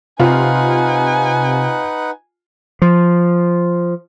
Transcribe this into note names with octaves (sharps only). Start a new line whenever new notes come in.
C3 D#4 F4 B4 F#5 G#5
F3